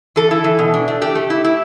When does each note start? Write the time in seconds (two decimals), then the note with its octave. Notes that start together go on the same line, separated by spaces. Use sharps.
0.16 E3 A4
0.31 E4
0.44 E3
0.59 B2
0.74 D4
0.88 A3
1.01 A3 G4
1.15 A3
1.30 E4
1.44 E4